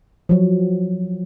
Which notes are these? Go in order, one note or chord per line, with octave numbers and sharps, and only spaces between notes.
F3 F#3